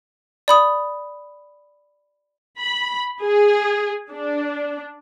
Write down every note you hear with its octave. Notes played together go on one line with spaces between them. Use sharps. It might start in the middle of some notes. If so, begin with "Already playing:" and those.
D5 B5 D#6
B5
G#4
D4